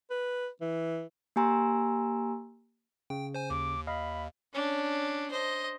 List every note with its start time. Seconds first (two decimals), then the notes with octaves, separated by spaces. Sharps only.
0.10 B4
0.61 E3
1.36 A#3 G4 G#5 A#5 C6 E6
3.10 C#3 G5
3.34 C5 G#5
3.50 D#2 D6
3.87 D#5 F5 B5
4.53 C#4 D4
5.31 C5 D#5